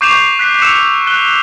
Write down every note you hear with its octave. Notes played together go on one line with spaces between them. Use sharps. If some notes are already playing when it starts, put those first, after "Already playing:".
C#6 D6 G6 C7 E7 F7
F#6 B6 C7
E6 C#7 E7 F7
F#6 G7